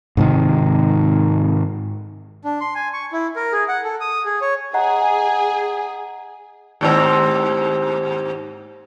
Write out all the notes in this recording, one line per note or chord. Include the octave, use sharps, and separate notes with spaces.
G#2 C3 D#3
D4
C6
G#5
C#6
E4
A#4
G#4
F#5
A4
D#6
G#4
C#5
G#4 D#5 F#5 A#5
D#2 G#2 C4